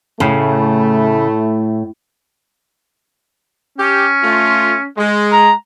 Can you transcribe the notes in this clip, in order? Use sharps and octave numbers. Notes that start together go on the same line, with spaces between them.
A2 C#3 A3 E4
C#4 G4
A3 F4
G#3
A#5